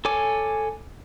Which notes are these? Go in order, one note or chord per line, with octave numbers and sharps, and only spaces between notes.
A4 C#5 G#5 D6